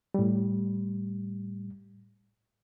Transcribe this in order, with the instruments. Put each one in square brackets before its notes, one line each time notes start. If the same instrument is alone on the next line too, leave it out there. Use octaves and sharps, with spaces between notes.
[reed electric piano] A2 G3